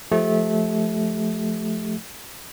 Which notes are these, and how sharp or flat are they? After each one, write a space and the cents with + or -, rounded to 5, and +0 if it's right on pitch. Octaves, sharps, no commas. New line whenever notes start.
F3 +0 A3 -20 G4 +0